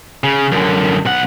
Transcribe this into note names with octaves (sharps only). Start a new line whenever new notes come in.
C#3
F#2 D3
B1 F#5